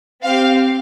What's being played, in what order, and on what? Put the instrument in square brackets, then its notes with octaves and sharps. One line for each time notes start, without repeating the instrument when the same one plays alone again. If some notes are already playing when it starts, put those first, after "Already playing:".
[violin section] C4 G4 F5